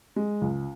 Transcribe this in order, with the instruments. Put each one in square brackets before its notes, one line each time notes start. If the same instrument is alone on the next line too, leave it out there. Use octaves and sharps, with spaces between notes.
[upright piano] G#3
C#2